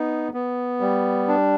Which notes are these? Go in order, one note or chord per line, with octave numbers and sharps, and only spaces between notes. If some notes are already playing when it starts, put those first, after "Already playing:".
Already playing: B3 D#4
B3
G3
D4